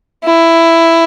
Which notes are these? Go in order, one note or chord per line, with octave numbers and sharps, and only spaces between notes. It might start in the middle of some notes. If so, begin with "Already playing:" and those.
E4